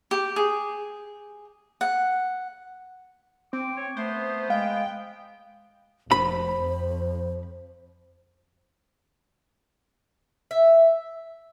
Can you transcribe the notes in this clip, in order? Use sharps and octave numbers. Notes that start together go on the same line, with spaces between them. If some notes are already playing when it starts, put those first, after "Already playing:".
G4
G#4
F#5
C4 D6
C#5
A3 B3 C5
G#3 F5 G5
F1 C5 B5
F2
E5